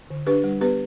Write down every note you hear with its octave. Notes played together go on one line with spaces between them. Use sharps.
D3
D4 G4 B4
G3
B3 G4 B4